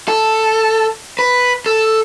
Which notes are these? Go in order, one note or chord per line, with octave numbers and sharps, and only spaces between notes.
A4
B4
A4